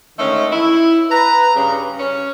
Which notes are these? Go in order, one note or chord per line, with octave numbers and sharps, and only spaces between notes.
D3 D#3 G#3 A3 C#4 A4
E4
B4 A#5
G2 C#3
C#4